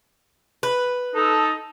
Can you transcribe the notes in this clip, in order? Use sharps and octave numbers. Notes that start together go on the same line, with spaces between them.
B4
D#4 A4